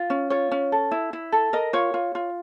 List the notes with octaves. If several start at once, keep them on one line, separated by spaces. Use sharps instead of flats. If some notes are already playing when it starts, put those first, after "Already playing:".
Already playing: F4
C#4
F4 C#5
C#4
A4
E4
E4
A4
A#4 D#5
F4 C#5
F4
F4